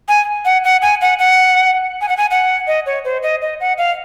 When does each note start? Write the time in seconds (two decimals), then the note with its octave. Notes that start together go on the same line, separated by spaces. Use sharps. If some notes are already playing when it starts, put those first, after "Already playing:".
0.08 G#5
0.45 F#5
0.64 F#5
0.82 G#5
1.01 F#5
1.19 F#5
2.01 G#5
2.09 F#5
2.17 G#5
2.31 F#5
2.67 D#5
2.86 C#5
3.05 C5
3.23 D#5
3.42 D#5
3.60 F#5
3.78 F5